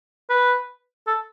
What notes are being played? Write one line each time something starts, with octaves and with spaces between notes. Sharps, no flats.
B4
A4